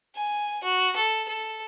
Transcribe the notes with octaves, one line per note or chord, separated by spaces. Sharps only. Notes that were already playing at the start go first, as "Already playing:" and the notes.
G#5
F#4
A4
A4